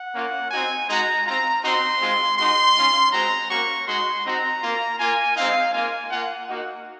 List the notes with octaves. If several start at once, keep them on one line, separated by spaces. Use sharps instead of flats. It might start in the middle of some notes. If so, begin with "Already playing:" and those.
Already playing: F#5
A#3 C#4 F4
C4 D#4 F#4 G#5
G#3 D#4 F#4 A#5
C4 F4 A#5
C4 D#4 F#4 C6
G#3 C4 F4
G#3 D#4 F#4 C6
G#3 C#4 F4
G#3 C4 F#4 A#5
A#3 C#4 F#4 C#6
G#3 D#4 F#4 C6
C4 D#4 F#4 A#5
A#3 F4
A#3 F4 G#5
G#3 C4 D#4 F5
A#3 F4 G#5
A#3 F4 F#5
A#3 D#4 F#4 F#5